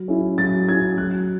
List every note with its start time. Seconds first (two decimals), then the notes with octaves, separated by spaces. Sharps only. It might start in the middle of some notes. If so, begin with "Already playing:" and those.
Already playing: F#3
0.08 C#4 E4
0.38 F#3 A6
0.69 C#4 E4 G#6
0.97 F#3 F#6